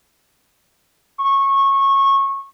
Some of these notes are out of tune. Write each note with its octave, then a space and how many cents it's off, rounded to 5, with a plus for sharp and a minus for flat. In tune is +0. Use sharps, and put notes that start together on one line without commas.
C#6 -20